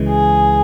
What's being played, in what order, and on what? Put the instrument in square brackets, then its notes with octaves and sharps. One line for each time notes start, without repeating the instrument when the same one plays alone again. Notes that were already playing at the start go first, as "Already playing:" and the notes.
Already playing: [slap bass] C#2 C#3 E3 G#3
[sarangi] G#4